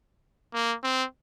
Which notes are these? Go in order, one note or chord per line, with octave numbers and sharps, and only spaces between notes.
A#3
C4